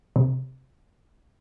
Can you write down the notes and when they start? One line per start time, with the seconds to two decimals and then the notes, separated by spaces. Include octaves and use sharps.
0.16 C3